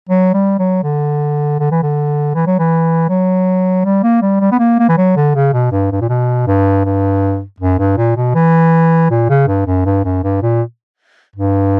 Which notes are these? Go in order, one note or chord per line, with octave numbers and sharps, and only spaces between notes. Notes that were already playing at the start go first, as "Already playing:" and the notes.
F#3
G3
F#3
D3
D3
E3
D3
E3
F#3
E3
F#3
G3
A#3
G3
G3
B3
A#3
A#3
E3
F#3
D3
C#3
B2
G2
G2
A#2
B2
G2
G2
F#2
G2
A#2
B2
E3
A#2
C#3
G2
F#2
G2
F#2
G2
A#2
G2